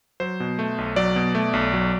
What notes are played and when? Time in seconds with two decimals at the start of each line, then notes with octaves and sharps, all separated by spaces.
0.20 F#3 C5
0.40 B2
0.59 A3
0.78 B1
0.96 F#3 D5
1.16 B2
1.35 A3
1.53 B1
1.74 F#3